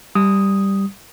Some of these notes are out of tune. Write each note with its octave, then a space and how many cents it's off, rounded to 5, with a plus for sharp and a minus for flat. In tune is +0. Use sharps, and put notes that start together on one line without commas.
G3 +0 D#6 +0